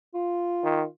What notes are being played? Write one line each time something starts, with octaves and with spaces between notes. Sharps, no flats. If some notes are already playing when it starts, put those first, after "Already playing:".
F4
D#3